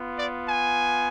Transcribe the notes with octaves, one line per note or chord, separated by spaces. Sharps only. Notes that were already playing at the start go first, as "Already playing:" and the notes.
Already playing: B3 F4
D5
G#5